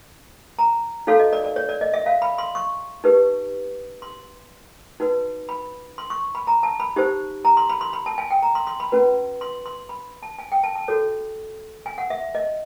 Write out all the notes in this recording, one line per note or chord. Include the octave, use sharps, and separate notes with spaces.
A#5
D#4 F#4 A4 C#5 F5
D#5
D5
D5
C#5
D5
D#5
E5
F5
B5
C6
C#6
D#4 G4 B4
C6
D#4 F#4 B4
B5
C6
C#6
B5
A#5
A5
B5
D#4 G4 C5
A#5
C6
B5
C6
B5
A5
G#5
G5
A#5
C6
C6
B5
C#4 F#4 B4
C6
C6
B5
A5
G#5
G5
A5
A5
F#4 A4 C#5
G#5
F#5
E5
D#5